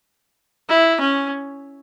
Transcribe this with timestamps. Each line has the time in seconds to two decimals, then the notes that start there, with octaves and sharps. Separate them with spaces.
0.69 E4
1.00 C#4